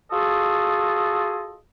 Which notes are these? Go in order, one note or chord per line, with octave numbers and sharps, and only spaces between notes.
F4 F#4 G#4 A4 D#5